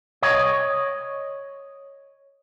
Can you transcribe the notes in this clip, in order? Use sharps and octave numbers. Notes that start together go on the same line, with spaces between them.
C#5 D#5